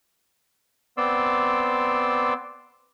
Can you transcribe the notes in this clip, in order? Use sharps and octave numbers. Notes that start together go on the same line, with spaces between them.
B3 C4 D5 C6 D6 E6